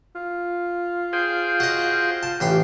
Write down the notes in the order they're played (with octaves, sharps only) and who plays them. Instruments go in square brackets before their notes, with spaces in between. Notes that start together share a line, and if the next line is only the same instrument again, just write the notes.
[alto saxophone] F4
[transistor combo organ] G#4 C5 G5
[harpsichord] F#4 D#5
A5
A1 G4 C6